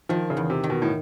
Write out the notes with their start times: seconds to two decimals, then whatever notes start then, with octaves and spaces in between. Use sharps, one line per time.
0.09 D#3 F3
0.30 C#3
0.37 E2
0.50 C3
0.64 D#3
0.70 B2
0.82 A2